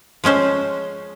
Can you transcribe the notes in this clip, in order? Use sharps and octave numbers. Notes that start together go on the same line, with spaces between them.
F3 G#3 C#4 C5